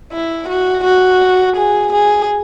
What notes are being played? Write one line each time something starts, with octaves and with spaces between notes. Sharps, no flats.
E4
F#4
F#4
G#4
G#4